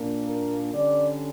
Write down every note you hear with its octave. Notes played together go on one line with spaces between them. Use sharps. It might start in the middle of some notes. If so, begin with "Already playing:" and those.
Already playing: A#2 A#3 D4
A#4
D3 G3 C#4 D5